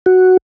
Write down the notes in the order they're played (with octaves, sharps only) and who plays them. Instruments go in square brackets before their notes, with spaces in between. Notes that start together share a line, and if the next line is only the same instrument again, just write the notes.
[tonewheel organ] F#4